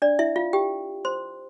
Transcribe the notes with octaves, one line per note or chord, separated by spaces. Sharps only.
D4 D5
E4 E5
F4 F5
G4 G5
C5 C6